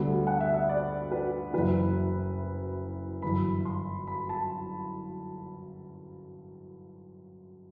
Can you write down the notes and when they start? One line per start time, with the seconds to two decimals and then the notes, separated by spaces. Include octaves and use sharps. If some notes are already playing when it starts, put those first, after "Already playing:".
Already playing: D2 D3 G3 B3
0.27 F#5
0.40 E5
0.54 E5
0.69 D5
1.11 B4
1.53 F#1 F#2 E3 B4
3.22 G1 F#2 E3 B5
3.65 C6
4.07 B5
4.29 A5